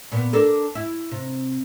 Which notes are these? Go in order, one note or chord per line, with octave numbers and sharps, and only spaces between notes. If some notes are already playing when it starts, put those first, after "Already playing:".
A#2 B3
D4 A4 A#4
E4
C3